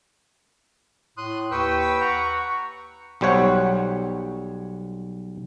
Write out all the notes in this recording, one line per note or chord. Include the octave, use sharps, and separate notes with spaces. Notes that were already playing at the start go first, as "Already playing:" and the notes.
A2 C6 D#6 F#6
D#2 B4 G5 C#6 E6
F#5 A#5 C#6
B1 G3 C5 C#5 F#5